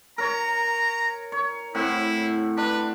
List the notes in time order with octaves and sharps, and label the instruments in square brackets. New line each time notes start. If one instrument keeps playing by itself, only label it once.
[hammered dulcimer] A#4 C#5 [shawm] A#5
[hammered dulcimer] C#5
[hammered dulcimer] A2 C4 F#5 [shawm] E4
[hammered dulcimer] D4 [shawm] B4